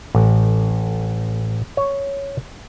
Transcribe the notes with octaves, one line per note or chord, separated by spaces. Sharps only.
A1
C#5